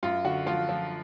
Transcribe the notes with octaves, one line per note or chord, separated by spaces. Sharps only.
F#2 F4
D3 F#4
F3 F4
F3